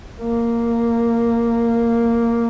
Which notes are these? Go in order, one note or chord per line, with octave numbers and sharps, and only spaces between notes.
A#3